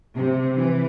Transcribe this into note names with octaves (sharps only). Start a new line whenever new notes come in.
C3
E3